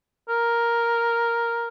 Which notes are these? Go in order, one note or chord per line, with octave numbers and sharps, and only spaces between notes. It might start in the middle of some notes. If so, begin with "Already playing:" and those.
A#4